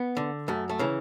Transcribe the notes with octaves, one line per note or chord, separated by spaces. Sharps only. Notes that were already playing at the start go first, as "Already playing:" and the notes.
Already playing: B3
D3
F#2 A3
A3
C#3 E3